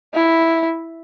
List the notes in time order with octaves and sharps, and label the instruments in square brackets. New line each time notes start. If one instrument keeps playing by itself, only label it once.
[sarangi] E4